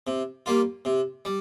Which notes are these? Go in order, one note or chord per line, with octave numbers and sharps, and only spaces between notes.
C3
G3 A#3 F4
C3
G3